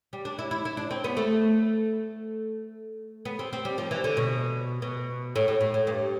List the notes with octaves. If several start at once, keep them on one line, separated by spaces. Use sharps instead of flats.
G3
D4
E4
E4
E4
D4
C4
B3
A3
B3
C4
C4
G3
F3
E3
D3
B2
B2
A2
A2
A2
A2
G2